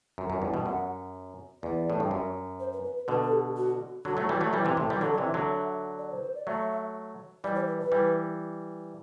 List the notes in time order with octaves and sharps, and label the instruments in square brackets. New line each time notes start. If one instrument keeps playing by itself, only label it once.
[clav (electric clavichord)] F#2
F#2
E2 G2
G2 B2
[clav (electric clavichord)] F#2 [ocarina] F#5
[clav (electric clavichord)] E2 [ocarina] D5
[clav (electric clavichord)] A2
G2
F#2
[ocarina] C5
B4
B4
B4
[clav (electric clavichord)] B2 D3 [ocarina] B4
[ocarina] A4
G4
F#4
[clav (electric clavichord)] D3 F#3 [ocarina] F#4
[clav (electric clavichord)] F#3 A3
E3 G3
F#3 A3
E3 G3
C3 E3
A2 C3
E3 G3
[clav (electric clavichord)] D3 F#3 [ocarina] A4
[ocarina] D5
[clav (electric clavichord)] C3 E3
[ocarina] E5
[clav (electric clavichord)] D3 F#3
[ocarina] E5
D5
C5
B4
C5
D5
[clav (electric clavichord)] F#3 A3 [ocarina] E5
[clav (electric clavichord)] E3 G3 [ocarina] D5
[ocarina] C5
B4
B4
[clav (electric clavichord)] E3 G3